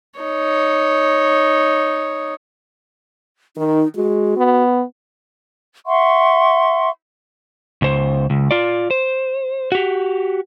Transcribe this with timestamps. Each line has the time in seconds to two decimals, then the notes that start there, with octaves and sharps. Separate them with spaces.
0.19 D#4 C#5
3.57 D#3 D#4
3.96 G#3 F#4
4.37 B3
5.85 E5 F#5 C6 C#6
7.82 C#2 C5
8.30 C#2
8.51 F4 D5
8.91 C5
9.72 F#4 G4